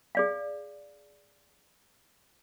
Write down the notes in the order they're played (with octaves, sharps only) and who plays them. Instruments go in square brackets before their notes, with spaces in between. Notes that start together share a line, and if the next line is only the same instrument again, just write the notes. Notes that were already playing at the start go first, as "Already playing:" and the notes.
[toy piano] G#4 D5 F5